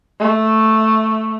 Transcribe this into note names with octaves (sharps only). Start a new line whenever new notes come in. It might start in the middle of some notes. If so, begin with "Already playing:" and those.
A3